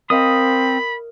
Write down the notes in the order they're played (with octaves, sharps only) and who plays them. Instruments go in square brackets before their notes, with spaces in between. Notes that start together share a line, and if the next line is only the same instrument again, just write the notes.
[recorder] C4 [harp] A#4 D#5 F5 [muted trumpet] B5 [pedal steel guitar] D#6